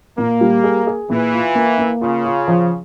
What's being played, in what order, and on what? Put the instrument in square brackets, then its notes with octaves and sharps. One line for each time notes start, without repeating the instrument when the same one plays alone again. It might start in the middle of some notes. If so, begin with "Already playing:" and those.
[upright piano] A#2 [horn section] A#3
[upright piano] G3
G#4
G#4
[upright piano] A#2 [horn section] E3
[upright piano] F4
A#3
A#3
[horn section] C#3 [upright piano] F4
[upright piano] F4
F3